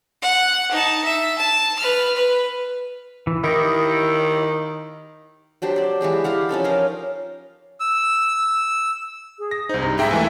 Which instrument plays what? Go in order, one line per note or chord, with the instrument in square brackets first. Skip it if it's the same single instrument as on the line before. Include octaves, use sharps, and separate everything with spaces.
[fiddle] F#5
D#4 A5
E5
A5
B4 F6
B4
[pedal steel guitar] E3
[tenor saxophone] D#3 [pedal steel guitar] E4 G4 D#5
[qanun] F#3 D4 G4 C5
C5 D5
E3 G#3 G4 G#4
E4 G4 F5 F#5
F3 C#4 D#4 A4
A#4 C#5 D#5 F5
[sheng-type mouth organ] E6
[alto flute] G#4
[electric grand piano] A#6
[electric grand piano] C2 D#4 [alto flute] C5
[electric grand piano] G2 [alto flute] A#5
[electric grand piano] G#2 G#3 G5 [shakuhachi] E5
[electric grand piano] D#2 E3 A3 [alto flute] G#5